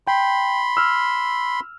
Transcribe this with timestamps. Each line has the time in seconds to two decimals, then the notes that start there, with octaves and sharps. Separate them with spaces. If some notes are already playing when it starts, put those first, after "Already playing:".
0.07 G5 B5 C6
0.77 E6 F6